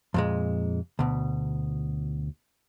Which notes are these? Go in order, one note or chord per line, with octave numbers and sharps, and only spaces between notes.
F2 A#2 G#3
D2 B2